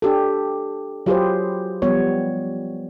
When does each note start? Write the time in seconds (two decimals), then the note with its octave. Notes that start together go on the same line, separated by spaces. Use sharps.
0.02 D4 G4 A4
1.06 F#3 F4 G4 G#4 B4 C5
1.82 F3 G3 B3 C#5